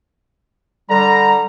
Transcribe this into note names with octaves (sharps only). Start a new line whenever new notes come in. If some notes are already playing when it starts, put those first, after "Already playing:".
D3 G3 A#5